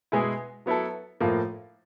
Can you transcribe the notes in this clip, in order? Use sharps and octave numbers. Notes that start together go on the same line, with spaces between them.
B2 G#3 B3 E4 G#4
F#3 B3 E4 A4
A2 F3 A#3